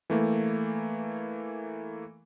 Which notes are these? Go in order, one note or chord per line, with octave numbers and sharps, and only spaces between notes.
E3 A3 A#3